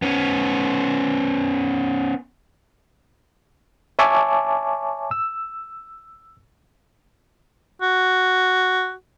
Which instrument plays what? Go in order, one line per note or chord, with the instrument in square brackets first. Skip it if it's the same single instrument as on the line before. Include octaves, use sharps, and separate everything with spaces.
[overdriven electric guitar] B3 C#4
[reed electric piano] C#5 E5 G#5 A5 C#6 D6
E6
[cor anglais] F#4